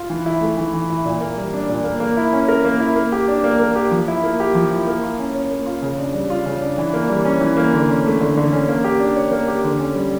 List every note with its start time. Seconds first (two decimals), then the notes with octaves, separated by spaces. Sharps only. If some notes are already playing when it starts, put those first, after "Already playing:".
Already playing: F4
0.10 E3
0.26 E4
0.41 A3
0.57 E3
0.74 E3
0.90 E4
1.05 A#2
1.21 A#3
1.38 G3
1.54 D4
1.69 A#2
1.84 A#3
2.00 A#3
2.17 E4
2.33 C#4
2.48 A#4
2.65 A#3
2.80 E4
2.96 A#3
3.12 G4
3.28 D4
3.44 A#3
3.60 A#3
3.76 G4
3.91 F3
4.08 E4
4.24 A#3
4.40 G4
4.55 F3
4.71 E4
4.87 A#3
5.03 F4
5.19 C#4
5.35 C#5
5.51 A#3
5.66 F4
5.82 C#3
5.99 D4
6.14 G3
6.30 F4
6.46 C#3
6.62 D4
6.78 E3
6.94 A#3
7.09 G3
7.25 C#4
7.41 E3
7.57 A#3
7.73 D3
7.89 C#4
8.06 A3
8.20 D3
8.37 D3
8.52 C#4
8.68 A#3
8.84 G4
9.00 D4
9.16 C#5
9.32 A#3
9.48 G4
9.64 D3
9.79 C#4
9.95 G3